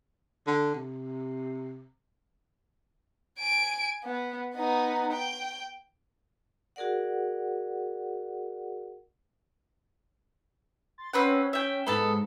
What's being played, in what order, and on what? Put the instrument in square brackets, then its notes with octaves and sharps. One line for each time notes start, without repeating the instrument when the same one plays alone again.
[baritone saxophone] D3
C3
[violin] G#5 D7
B3
B3 D#4
G5
[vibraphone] F#4 G#4 A#4 D5 F#5
[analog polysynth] C6 A6
[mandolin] C4 B4 F#5 [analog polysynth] C#4
[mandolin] E5 G5
[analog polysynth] G#2 G#3 [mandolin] B3 A4 A5